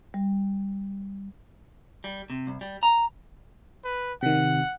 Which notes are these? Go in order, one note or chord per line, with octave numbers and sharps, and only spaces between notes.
G3
G3
C3
C2
G3
A#5
B4
C3 D#3 F#5